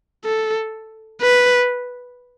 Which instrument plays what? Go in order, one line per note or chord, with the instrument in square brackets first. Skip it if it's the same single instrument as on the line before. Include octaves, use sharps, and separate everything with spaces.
[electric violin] A4
B4